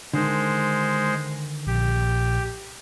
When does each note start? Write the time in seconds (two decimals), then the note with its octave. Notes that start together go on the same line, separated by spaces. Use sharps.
0.13 D3 D#3 G#3 C5
1.67 A#1 G4